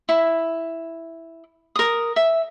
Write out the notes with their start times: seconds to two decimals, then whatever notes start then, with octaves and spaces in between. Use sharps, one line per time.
0.09 E4
1.76 A#4 D#6
2.16 E5